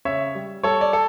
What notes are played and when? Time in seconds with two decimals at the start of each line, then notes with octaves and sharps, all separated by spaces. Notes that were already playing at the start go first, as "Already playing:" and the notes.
0.05 C#3 C#5 E5
0.35 G3
0.63 G3 A4 C#5
0.81 D5
0.93 A4